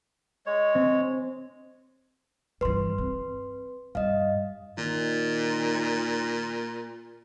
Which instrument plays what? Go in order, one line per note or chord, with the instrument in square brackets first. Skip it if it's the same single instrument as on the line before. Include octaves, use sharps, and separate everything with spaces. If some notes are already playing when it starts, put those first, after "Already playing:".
[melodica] G#3 C#5
[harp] C4
[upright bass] G2 E3 [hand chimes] B4 C6
[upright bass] C4
[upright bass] G2 [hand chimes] D#5 F5
[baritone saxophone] A#2 [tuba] D#3